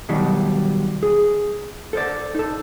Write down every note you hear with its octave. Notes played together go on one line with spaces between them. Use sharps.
B2 D#3 F#3 G3
G#4
A4 C5 D5
D#4 A4